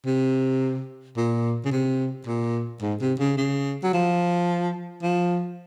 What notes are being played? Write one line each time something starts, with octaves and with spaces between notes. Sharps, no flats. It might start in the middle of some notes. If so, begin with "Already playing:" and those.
C3
A#2
C#3
C3
A#2
G#2
C3
C#3
C#3
F#3
F3
F3